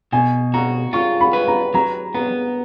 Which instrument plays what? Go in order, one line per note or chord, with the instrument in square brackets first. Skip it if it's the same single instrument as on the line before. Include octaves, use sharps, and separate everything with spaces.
[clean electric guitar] B2 [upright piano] G#5
[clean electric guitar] F#4 [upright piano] A#5
[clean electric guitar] F4 [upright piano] C#6
[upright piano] B5
[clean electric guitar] B4
[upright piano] A#5
[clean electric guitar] F#3 [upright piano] A#5
[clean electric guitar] B3 [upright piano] A#5